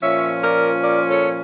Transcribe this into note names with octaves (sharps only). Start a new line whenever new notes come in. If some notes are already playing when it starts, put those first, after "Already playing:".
A#2 F3 C#4 C#5 E5
A#4 D5
A#4 D5
A4 C#5